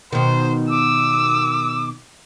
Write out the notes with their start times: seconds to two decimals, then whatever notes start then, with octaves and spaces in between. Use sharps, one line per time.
0.12 B2 D#3 C5
0.70 D6 E6